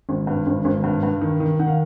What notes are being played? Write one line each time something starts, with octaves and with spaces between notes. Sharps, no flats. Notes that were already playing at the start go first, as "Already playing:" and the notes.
G#1
G2
G#1
G#1
G2
G2
D#3
D#3
D#3 F#5
F5